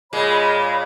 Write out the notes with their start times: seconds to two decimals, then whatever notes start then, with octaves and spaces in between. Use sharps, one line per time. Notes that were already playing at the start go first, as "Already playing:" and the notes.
0.13 A#2 G#3 C#5 D#5 B5